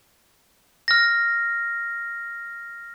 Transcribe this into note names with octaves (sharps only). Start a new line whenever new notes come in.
F6 A#6